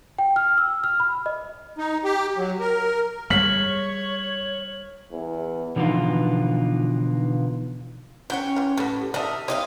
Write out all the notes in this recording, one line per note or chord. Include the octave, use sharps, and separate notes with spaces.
G5
F6
E6
F6
B5
D#5
D#4
G4
F#3
A#4
G3 G#3 C#5 F6 B6 F#7
E2
B2 D3 E3 F3 D#4 F4
C#4 E4 F#4 C#5 G5
E3 F4
A2 G3 B3
G4
D#4 A#4 D5 E5 A5
C4 D#4 G4 C#5 D#5 F5